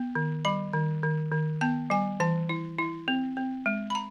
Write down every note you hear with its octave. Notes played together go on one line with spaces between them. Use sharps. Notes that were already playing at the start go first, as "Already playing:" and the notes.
Already playing: B3
D#3
G3 B5
D#3
D#3
D#3
B3 A5
G3 G#5
E3 A5
E4
E4
C4
C4
G#3
B5
A#5